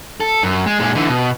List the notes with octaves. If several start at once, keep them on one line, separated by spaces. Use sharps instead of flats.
A4
F#2
G#3
A#2 G#3
D3 E3
B2